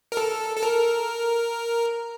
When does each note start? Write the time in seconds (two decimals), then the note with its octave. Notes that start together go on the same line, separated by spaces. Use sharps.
0.12 A#4
0.17 A4
0.57 A4
0.63 A#4